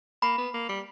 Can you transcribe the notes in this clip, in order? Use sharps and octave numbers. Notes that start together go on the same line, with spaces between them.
A#3 B5
B3
A#3
G3